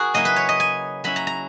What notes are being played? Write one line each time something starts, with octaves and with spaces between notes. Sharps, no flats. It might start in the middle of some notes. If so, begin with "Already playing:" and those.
Already playing: F#4 G#4 A#4
C#3 F#3 A#3 C#4 E4 D#5
B4
C#5
D#5
G#5
F#3 C#4 E4 B5
A#5
A#5